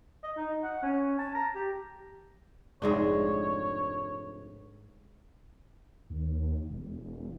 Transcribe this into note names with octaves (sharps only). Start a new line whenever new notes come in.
D#5
D#4
F#5
C#4
A5
A#5
G4
F1 G#2 G#3 D4 C#5
D#2
E1